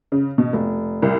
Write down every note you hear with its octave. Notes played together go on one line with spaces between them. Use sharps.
C#3
B2
F1
C2